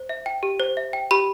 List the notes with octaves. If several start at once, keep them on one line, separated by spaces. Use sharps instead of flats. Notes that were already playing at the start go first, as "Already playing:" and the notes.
Already playing: C5
E5
G5
G4
C5
E5
G5
G4 B5